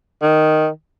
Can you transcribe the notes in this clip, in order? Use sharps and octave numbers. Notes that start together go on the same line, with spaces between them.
D#3